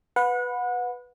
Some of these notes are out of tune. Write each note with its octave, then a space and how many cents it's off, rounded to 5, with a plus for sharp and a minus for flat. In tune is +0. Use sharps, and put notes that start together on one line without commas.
B4 +0 F#5 -30